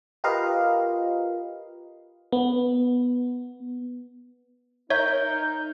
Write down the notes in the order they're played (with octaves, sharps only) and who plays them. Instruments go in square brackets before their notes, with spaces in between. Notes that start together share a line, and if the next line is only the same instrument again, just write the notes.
[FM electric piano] F4 G4 A#4 B4 D#5 F5
B3
[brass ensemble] D#4 [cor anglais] A#4 [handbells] C#5 E5 [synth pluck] G6